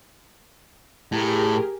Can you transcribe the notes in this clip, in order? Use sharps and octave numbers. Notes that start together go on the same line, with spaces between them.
A2 G4 G#4 A#4